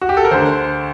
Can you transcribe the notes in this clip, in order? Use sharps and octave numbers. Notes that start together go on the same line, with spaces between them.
F#4
G4
A4
A#4
D2 D3 C5